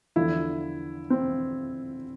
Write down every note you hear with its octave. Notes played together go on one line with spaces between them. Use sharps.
E2 D3 F3 E4
C4